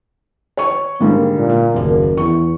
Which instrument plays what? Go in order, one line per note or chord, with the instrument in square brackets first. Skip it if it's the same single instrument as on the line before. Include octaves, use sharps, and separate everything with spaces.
[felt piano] C#5 C#6
[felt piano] G#2 D3 G3 [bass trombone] A#3
[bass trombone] A#2
[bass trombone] F#1 [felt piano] D#2 A#3
[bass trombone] E2 [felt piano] C#6